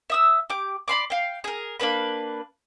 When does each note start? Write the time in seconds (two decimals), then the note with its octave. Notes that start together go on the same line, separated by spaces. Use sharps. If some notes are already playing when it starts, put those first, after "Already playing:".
0.10 E5 D#6 E6
0.50 G4 D6
0.88 D5 B5 C6 D6
1.10 F5 G5
1.44 G#4 A#4
1.80 A#3 D4 B4 B5